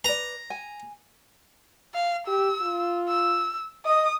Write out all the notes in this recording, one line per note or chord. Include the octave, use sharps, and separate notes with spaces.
B4 D5 A#5
G#5
F5
G4 E6
F4
E6
D#5 D#6